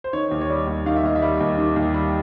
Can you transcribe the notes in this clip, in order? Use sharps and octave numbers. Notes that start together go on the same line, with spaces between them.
C5
D#3 C#5
D#2
C#5
G3 D5
D#2
D#3 F5
E5
D#2 D#5
E5
G3
D#2
D#3
D#2
G3